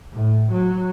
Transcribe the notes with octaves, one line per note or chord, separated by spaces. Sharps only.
A2
F#3